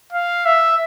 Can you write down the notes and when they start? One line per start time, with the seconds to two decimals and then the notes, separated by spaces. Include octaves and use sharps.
0.13 F5
0.46 E5